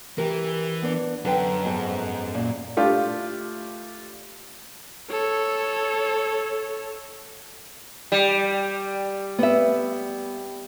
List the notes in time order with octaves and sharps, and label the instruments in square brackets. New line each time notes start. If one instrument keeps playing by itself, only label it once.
[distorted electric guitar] E3 [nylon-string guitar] G4 A#4
[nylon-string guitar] B3 D4
[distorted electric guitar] F#2 [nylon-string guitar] D3 B4 G5
[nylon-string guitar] F2 G#2 B3
A#2
[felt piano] A3 D4 F4 G4
[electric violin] A4 C#5
[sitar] G3
[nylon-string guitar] B3 E5